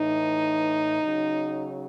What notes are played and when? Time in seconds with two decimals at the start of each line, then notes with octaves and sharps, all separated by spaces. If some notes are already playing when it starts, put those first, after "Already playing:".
Already playing: A2 E3 D#4
1.02 C#3 F#3